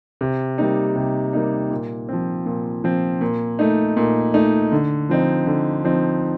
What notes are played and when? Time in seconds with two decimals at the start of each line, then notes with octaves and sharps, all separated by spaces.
0.21 C3
0.58 G3 A#3 D#4
0.96 C3
1.33 G3 A#3 D#4
1.71 A#2
2.09 F3 C4
2.46 A#2
2.84 F3 C4
3.21 A#2
3.59 A3 D#4
3.97 A#2
4.34 A3 D#4
4.72 D3
5.09 F3 C4 D#4
5.47 D3
5.84 F3 C4 D#4